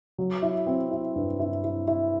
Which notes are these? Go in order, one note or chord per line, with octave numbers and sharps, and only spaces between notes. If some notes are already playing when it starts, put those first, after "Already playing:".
F#3
E4
C4
E4
G2
E4
E4
E4